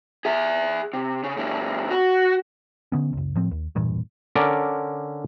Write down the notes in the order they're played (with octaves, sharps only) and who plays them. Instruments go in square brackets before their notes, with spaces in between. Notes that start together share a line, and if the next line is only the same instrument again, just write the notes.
[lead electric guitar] G#4 E5
C3
C#3
A#2 E3
F#4
[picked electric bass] D3 B3 C#4
F#1 C#2
A2 F3 C4
D#2
E1 G2 A#2 E3
[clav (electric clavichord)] D3 C#4 A#4 D5